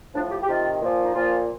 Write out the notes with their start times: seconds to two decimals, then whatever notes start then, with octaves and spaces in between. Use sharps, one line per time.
0.14 A2 F3 D4
0.31 G4
0.43 G4
0.48 C3 D#3 F4
0.82 A#2 F3
1.04 D#4
1.14 A#2 F3 F4